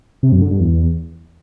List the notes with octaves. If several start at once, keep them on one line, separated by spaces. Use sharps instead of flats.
C3
F#2
D3
G2
E2